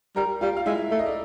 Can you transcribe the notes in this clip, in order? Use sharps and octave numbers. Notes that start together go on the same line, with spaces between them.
G3 A#4 A#5
G3 F4 F5
F5
G#3 E4 E5
A3 E5
D#5
D5